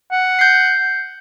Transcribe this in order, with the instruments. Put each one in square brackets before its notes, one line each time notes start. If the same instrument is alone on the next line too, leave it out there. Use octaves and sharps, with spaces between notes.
[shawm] F#5
[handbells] G6 C7